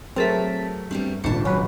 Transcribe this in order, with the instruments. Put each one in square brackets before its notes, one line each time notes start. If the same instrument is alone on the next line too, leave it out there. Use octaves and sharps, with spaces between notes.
[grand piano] F#3 A3 [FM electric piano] C4 A5 B6 [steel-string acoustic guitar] G#4 A#4
[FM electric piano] G2 [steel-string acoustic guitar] G3 B3 C4
[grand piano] D#1 G#1 C#3 [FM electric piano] A#2 C#7 [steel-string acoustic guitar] D4 A5
[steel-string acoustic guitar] F#3 [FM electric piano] C#4 F#4 B4